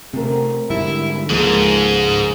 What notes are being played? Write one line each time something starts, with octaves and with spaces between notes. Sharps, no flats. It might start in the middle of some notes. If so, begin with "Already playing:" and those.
C3 A3 C4 A#4
G#2 D3 G3 E4
C#2 G#2 F3 A#3 G#4 A4